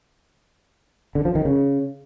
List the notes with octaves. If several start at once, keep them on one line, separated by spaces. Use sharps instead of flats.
D3
F3
D#3
C#3